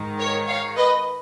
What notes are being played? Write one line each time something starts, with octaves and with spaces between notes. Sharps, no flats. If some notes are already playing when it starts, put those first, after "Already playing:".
Already playing: G#2 D#3
A#4 C#5
C#5 F5
B4 D#5